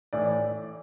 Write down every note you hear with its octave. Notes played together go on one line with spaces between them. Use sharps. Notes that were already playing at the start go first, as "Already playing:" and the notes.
A2 E3 D5